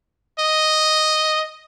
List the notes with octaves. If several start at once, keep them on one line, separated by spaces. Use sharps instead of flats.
D#5